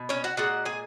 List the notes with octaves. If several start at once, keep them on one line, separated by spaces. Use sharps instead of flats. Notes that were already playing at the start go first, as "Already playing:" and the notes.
Already playing: B2
C#4 C#5
F#4 F#5
A#2 G#3 F#4 F#5
G#4 G#5